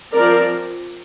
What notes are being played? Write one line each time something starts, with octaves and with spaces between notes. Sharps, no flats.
F3 C4 A#4 D5